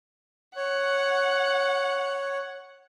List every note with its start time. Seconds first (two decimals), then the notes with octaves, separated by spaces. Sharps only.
0.56 C#5 F#5